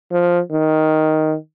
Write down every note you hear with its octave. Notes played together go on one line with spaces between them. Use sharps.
F3
D#3